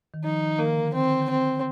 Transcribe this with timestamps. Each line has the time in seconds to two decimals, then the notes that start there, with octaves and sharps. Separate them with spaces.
0.14 D#3
0.24 F3 D#4
0.41 D#3
0.58 D#3 A#3
0.76 D3
0.94 D#3 C4
1.12 D3
1.29 C4